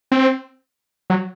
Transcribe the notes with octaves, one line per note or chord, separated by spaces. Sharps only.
C4
F#3